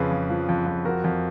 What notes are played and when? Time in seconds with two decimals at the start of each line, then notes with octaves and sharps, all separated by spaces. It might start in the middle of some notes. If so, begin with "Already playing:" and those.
Already playing: F2 C#3 G#4 B4
0.11 F2
0.30 F3
0.49 F2
0.66 F2
0.85 F2 F#4 A#4
1.04 F2